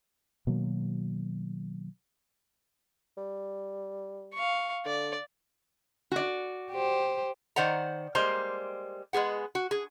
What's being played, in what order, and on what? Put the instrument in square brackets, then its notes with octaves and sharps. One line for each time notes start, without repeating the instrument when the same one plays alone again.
[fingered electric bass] B2 D#3 F#3 A#3
[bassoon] G3
[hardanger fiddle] F5 C#6
[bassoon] D3 [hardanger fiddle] D5
[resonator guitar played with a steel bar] F#4 D5
[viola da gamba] G4 C5
[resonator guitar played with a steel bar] D#3 C5 D5 F#5 A#5
G3 G#3 A#3 C5 A#5
G#3 B3 G#4 F#5
F#4
G#4